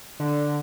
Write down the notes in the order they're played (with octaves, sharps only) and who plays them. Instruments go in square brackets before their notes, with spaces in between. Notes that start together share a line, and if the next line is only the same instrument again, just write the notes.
[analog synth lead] D3